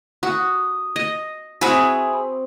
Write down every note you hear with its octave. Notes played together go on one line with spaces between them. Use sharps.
F#4 D#6
D#5
C4 E4 F#4 G#4